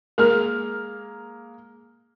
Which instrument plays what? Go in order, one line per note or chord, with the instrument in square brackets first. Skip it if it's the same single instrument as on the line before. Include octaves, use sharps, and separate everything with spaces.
[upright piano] G#3 A#3 F6 [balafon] A#4